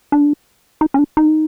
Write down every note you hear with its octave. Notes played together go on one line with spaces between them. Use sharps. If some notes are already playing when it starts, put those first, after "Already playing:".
D4
D#4
C#4
D4
D#4